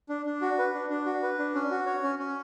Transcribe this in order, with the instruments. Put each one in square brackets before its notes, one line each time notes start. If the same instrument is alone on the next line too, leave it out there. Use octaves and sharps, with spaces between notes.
[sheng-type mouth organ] D4
D4
F#4
B4
D4
D4
F#4
B4
D4
C#4
F#4
C#5
C#4
C#4